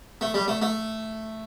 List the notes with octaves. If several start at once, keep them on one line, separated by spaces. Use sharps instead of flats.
A3
G3
A3
A3